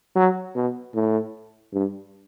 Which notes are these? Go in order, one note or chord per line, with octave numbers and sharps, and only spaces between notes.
F#3
B2
A2
G2